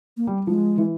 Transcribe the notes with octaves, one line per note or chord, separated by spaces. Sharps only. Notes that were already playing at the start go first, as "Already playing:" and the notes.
A#3
G3
F3 G#3
E3